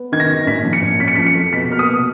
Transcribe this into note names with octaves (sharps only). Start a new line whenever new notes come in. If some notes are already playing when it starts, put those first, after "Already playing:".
Already playing: B3
D#3 G#6
A#6
F#2
A#2 B6
F3
C#7
A#2
C#4 B6
C#7
B6
F3
C#7
F2
B2 B6
A#3 F6
D#6
B2